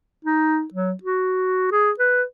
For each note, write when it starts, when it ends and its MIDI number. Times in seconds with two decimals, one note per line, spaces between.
0.25 0.64 63
0.74 0.92 54
1.03 1.67 66
1.72 1.92 68
1.99 2.23 71